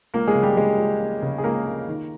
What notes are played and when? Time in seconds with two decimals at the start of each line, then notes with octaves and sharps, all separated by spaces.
0.14 C#2 A#3 A#4
0.27 G#3 G#4
0.35 C#3
0.42 G3 G4
0.56 G3 G#3 G#4
0.78 C#2
1.00 A#3
1.22 C#3
1.38 G#4
1.44 C#2 A#3 A#4
1.66 A#3
1.88 D#3